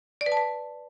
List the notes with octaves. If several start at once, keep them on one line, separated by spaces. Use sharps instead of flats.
D5
B4
A5
B4